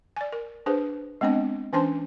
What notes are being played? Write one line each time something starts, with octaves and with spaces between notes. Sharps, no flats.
D5 G#5
A#4
D4 G#4 B4 C5
G#3 B3 C4 D4 D#5
E3 C#4 D4 C5 A5 C6